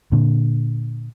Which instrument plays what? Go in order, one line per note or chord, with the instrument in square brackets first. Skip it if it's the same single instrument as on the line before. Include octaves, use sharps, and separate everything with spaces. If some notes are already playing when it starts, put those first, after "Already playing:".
[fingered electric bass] A#2 D3